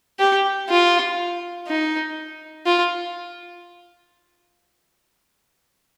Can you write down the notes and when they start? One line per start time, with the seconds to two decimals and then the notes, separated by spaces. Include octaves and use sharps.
0.19 G4
0.69 F4
1.68 D#4
2.66 F4